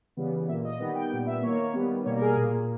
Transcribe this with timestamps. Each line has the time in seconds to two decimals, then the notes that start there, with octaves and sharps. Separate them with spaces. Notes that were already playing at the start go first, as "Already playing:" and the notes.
0.17 C#3 E3 G3 B3
0.48 A#2 A#3 E5
0.65 D#5
0.79 D#3 G3 B3 D#5
0.95 G5
1.11 A#2 G3 B3 G5
1.27 E5
1.42 D#3 A#3 C#5
1.73 D#3 G3 B3
2.04 B2 G3 A#3 C#5
2.16 A#4
2.21 G#4
2.36 A#2 A#3